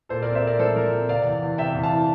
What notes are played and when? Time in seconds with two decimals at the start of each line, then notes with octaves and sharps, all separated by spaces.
0.09 A#2 A4 C5
0.22 C4 A#4 D5
0.35 C5 E5
0.43 C4 A#4 D5
0.59 F3 A4 C5
0.76 F3 A#4 D5
0.93 C4
1.09 C3 D5 F5
1.25 E2
1.42 E2
1.58 C3 E5 G5
1.75 E2
1.83 F5 A5
1.92 E3